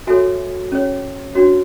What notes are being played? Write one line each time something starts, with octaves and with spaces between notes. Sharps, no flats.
F#4 A4 C#5 E5 G#5
C#4 G#4 C#5
D4 F#4 C#5